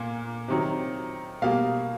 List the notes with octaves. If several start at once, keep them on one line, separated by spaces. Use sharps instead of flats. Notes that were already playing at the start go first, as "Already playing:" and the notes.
Already playing: A#2 A#3
C3 D#3 F#3
B2 G3 A#3 F5